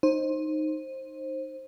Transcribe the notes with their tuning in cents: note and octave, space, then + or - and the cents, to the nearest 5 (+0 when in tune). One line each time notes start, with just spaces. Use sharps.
D#4 -10 C5 +20